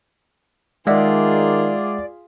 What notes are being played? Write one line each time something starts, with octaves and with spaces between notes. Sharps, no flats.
D#3 G#3 F4 G#4 D5 E5 F#5